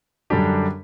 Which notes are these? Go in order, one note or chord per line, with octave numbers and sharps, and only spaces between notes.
F#2 D3 G3 D4 G4